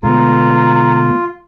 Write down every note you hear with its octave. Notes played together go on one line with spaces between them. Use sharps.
B2 D3 G#3 A3 B3 F4 A#5